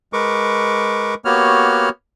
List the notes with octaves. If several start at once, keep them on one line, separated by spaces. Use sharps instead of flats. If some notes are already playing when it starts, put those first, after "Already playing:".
G#3 A#4 B4 C#6 D6
A#3 B3 F#4 G4 C#5 F6